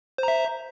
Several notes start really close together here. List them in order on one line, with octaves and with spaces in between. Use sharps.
C5 A#5 E5